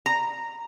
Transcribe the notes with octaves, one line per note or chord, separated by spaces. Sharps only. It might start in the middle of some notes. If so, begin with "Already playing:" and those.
A#5